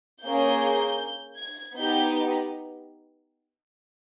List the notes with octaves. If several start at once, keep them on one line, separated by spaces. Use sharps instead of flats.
A#3 C#4 G#4 G6
G#6
B3 D#4 G4 G6